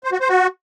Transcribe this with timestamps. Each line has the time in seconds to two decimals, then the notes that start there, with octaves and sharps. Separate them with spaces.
0.04 C5
0.12 F#4
0.20 C5
0.29 F#4